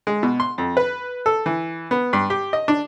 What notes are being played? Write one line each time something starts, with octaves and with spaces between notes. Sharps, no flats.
G#3
B2
C6
F2
B4
A4
E3
B3
G2
G4
D#5
D4